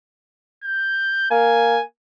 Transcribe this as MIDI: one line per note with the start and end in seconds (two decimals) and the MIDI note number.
0.64 1.28 91
1.31 1.78 58
1.31 1.84 80